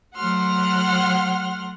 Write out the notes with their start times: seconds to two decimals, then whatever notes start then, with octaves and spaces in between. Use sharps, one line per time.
0.16 F#3 A3 F#5 C6 F6